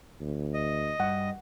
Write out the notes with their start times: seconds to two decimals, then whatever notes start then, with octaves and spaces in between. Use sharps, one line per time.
0.21 D2
0.54 D#5
1.00 G2 F#5